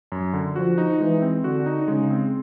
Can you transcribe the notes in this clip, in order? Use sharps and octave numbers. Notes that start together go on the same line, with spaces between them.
F#2
D3
F3 F#4
D#4
E3 G#3
C4
D3 F#4
D#4
C#3 G#3
C4